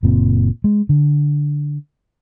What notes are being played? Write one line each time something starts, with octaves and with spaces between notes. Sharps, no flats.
F#1 A#2 C4
G#3
D3